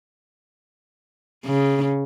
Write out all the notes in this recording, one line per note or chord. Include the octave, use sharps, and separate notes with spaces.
C#3